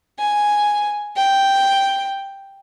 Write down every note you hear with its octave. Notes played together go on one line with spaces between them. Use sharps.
G#5
G5